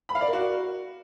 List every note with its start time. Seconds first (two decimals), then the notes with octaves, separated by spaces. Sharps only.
0.09 B5
0.15 F5
0.21 D5
0.27 A#4
0.33 F#4